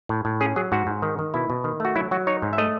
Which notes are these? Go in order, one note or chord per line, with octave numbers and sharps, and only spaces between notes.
A2
A2
C#4 G#4
F#3 G#4
G#2 F#4
G#2
D#3
D#3
B2 E4
B2
D#3
A3 F#4
F#3 E4
F#3 F#4
D#4 C#5
G#2
E5
A3 D#5